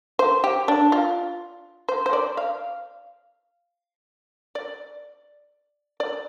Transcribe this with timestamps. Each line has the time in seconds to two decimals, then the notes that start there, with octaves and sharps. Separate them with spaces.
0.19 C5
0.44 G4
0.68 D4
0.92 F4
1.89 C5
2.06 C5
2.13 D5
2.37 F5
4.55 D5
6.00 D5